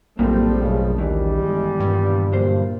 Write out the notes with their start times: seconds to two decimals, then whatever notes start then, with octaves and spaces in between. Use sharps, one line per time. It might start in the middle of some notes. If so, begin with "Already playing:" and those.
0.19 A#1 F#2 A2 F3 G3 A3 A#3 C4
0.63 B1 F#2 C#3
0.98 D#2 D#3 E3 G3
1.39 G1 G#3
1.80 G2 A#2 B3
2.32 F#2 A#2 D3 C5